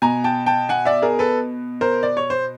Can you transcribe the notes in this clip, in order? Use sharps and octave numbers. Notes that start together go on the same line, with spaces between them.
B2 G#5 A#5
G5 A5
G5 A5
F#5 G#5
D5 E5
G#4 A#4
A4 B4
A#4 C5
D5
C#5
C5